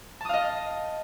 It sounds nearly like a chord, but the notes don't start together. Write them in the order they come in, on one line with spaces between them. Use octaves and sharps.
A5 D#6 F5 D#5